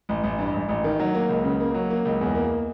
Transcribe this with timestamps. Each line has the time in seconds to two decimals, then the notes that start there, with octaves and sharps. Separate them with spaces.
0.09 A1
0.24 A1
0.39 G2
0.54 A1
0.69 A1
0.84 D#3
1.00 F#3
1.15 A#3
1.29 C#2
1.44 C#3
1.60 A#3
1.74 F#3
1.90 A#3
2.05 C#2
2.21 E2
2.35 A#3